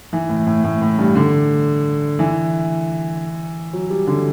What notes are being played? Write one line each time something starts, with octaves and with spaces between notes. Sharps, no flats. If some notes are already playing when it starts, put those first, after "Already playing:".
E3
A2
A2
A2
A2
G2
D3
E3
F#3
G3
D3